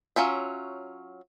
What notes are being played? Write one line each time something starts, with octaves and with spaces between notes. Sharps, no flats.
F#3 C#4 F4 E5